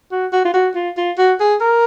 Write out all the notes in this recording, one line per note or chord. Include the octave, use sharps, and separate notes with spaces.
F#4
F#4
F4
F#4
F4
F4
F#4
G#4
A#4